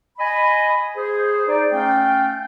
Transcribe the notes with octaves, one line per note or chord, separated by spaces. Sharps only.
D#5 G#5 B5
G#4 C5
D#4 D5
A3 C#4 F5 G5